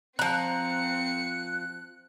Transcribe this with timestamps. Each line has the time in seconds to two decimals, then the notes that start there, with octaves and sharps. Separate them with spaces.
0.19 F3 C4 A#5 F#6 C#7